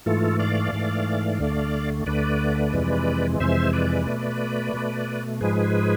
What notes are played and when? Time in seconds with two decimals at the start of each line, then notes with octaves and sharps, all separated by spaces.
0.06 G#2 E3 A3 F4 A4
0.39 D5 F5
0.73 G#2 E3 A3
1.40 D2 D3 A3
2.06 D2 D3 A3 B4 D5
2.73 F2 C3 E3 G#3
3.40 F2 C3 E3 G#3 C5 E5
3.73 B4 D5
4.07 B2 A3
4.74 B2 A3
5.41 G#2 F3 G#3 G#4 B4